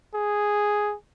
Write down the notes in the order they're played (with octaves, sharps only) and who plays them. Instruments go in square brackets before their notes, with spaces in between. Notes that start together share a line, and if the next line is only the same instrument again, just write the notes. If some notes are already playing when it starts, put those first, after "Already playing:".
[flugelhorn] G#4